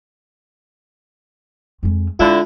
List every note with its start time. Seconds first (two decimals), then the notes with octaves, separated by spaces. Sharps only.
1.83 F2 G#3
2.19 D3 G#3 E4 F4 E5